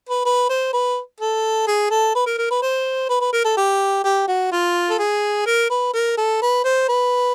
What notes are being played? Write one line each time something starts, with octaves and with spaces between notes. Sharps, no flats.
B4
B4
C5
B4
A4
G#4
A4
B4
A#4
A#4
B4
C5
B4
B4
A#4
A4
G4
G4
F#4
F4
A4
G#4
A#4
B4
A#4
A4
B4
C5
B4